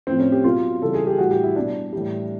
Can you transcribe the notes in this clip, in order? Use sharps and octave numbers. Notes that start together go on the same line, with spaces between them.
A2 F3 C4
C#4
G4
B2 F#3 F4
C#3 E3 G3 A4
G#4
G4
A2 E3 G3 F#4
G4
E4
B2 G3 D4
A2 E3 G3